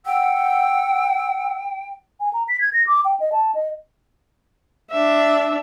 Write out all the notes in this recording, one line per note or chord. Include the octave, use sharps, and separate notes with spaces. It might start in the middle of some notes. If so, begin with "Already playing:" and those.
F#5 G5 E6
G#5
A#5
B6
G#6
A#6
D6
G5
D#5
A5
D#5
D4 E5